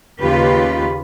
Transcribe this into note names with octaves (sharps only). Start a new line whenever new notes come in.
D#2 C#3 F4 G4 B4